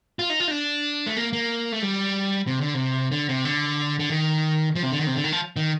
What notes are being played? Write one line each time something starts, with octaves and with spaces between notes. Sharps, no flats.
F4
D#4
F4
D#4
D4
A3
A#3
A#3
A3
G3
C3
D3
C3
D3
C3
D3
D3
D#3
F3
C3
D3
D#3
C3
D3
D#3
F3
D#3